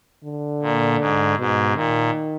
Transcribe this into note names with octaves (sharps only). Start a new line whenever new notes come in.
D3
A#2
G#2
G#2 B2
A#2 D#3